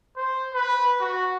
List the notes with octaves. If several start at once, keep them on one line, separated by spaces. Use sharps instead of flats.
C5
B4
F#4